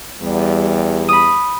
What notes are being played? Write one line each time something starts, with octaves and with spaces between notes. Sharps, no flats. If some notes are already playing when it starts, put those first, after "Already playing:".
E2 G3
B5 D#6